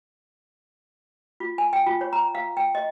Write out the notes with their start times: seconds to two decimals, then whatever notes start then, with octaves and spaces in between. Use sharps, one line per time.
1.40 F4
1.58 G#5
1.73 G5
1.87 F4
2.01 C#5
2.13 A#5
2.35 F5
2.57 G5
2.75 D#5